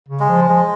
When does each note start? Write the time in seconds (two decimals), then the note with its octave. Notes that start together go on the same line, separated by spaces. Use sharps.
0.09 C#3
0.20 G#3
0.29 F3
0.48 F3 G#3